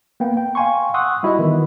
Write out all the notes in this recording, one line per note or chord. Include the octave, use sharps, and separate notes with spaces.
A#3 B3 G5
G5
F5 G5 G#5 C6 C#6
F#5 C6 C#6 D#6 E6 F#6
G3 E4 F#4 D#5 E5
D#3 E3 B3